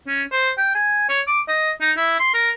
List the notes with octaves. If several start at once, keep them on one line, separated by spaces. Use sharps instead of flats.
C#4
C5
G5
G#5
C#5
D6
D#5
D#4
E4
C6
A#4